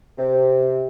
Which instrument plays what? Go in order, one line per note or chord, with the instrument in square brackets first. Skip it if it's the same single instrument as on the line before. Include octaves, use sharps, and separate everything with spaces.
[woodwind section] C3